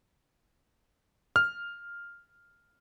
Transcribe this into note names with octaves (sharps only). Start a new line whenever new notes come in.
F6